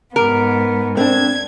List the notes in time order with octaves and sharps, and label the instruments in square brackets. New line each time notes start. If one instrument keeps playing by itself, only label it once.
[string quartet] G#2 B3 [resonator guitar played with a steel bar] A#4
[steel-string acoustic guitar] C4 D4 [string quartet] G#6